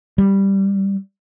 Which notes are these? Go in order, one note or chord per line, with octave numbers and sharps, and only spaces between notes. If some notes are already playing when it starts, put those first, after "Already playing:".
G3